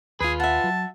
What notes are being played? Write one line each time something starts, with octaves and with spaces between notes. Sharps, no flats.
D#2 F4 G#4 B4
E5 F#5 A5
F#3